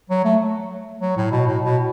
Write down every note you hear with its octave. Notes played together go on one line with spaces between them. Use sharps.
F#3
A3
F#3
A2
B2
A2
B2